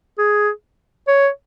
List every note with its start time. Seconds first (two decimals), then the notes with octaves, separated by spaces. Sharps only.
0.18 G#4
1.07 C#5